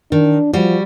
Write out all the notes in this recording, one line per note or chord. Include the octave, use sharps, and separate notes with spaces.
D#3 D4
F3 G3 F#4